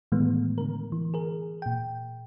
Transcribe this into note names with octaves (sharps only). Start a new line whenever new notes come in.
A2 D#3 E3 G#3 A3 B3
D3 A#4
E3
G#4 A#4
A#2 G5